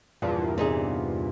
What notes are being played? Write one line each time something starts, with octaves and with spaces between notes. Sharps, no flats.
E2 G2 A#2 F3
C3 D#4 G#4